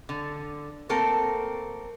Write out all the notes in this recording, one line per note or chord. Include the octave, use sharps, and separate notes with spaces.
D3
A3 A#3 C4 A4 A#4